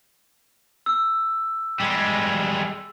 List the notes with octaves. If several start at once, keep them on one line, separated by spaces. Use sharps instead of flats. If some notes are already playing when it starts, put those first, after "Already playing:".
E6
G3 G#3